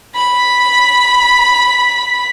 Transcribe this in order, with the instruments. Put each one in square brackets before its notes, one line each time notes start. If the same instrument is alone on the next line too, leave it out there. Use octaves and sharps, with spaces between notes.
[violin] B5 B6